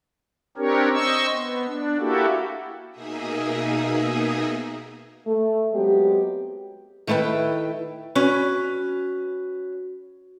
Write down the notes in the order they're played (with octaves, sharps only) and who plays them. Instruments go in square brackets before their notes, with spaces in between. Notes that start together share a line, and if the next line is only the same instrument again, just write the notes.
[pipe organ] C4 D4 G4 A#4 C#5
C5 D#5 C#6 E6
B3
D4
A#3 E4 F#4 G4 A4
[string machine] B2 A#3 D#4 G#4 D#5 E5
[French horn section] A3
F#3 G#3 B3 C4 G4
[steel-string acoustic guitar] D#3 A3 E4 B4 G5
[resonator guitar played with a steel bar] C#4 B4 [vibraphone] F#4